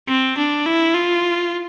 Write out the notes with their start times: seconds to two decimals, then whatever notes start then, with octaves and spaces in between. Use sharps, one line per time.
0.08 C4
0.38 D4
0.66 E4
0.94 F4